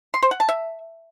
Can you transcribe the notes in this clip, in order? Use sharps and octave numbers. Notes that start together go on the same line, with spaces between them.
C6
C5
F#5
A5
E5